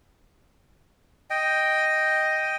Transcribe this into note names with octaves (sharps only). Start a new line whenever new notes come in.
D#5 G5